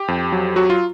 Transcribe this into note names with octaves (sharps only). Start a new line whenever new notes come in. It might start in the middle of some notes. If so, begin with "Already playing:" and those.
Already playing: G4
F2
F#3
F#3 F#4
F4